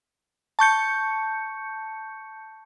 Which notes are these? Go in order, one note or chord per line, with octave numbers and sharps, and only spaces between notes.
A5 C#6 G6 C#7